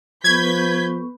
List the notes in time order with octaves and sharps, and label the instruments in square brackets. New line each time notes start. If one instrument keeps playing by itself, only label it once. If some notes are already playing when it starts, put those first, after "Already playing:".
[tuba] F3 [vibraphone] B3 A4 C#6 [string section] B4 G6 B6 [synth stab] G#6